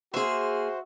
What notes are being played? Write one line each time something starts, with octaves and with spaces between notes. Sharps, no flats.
A#3 F#4 G#4 C5 E5 C6